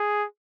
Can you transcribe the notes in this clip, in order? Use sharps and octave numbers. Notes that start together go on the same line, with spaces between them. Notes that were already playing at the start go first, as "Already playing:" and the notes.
Already playing: G#4